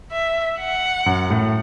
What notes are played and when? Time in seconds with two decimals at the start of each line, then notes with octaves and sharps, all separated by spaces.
0.12 E5
0.59 F#5
1.06 F#2
1.30 A2